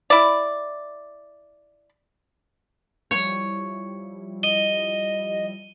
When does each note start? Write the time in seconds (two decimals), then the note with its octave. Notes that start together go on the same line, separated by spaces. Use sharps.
0.10 E4 D5
3.11 F3 G3 E4 C#5
4.43 D#5 D#7 G7